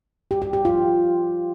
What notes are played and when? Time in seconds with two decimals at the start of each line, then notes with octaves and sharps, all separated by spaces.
0.31 G4
0.42 G4
0.53 G4
0.65 F4